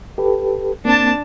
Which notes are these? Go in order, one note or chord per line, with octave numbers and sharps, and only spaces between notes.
G4 A4 B4
A#3 C4 D4 A5